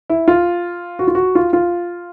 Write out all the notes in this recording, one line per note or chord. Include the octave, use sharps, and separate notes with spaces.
E4
F4
F#4
F4
F#4
F4
F4